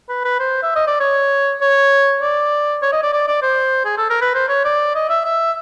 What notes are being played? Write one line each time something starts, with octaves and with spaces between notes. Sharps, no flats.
B4
B4
C5
E5
D#5
D5
C#5
C#5
D5
C#5
D#5
D5
D5
D5
C5
G#4
A4
A#4
B4
C5
C#5
D5
D#5
E5
E5